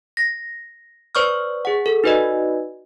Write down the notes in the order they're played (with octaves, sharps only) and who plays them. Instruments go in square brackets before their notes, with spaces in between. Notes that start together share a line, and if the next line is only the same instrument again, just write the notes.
[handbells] A#6
B4 C5 D5 C#6 D#6 F6
G#4 F#5
A4
D#4 F#4 B4 D5 D#5